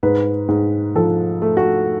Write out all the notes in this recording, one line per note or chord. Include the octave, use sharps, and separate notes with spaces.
G#2 B4
G#2
F3 A4
A3
F#4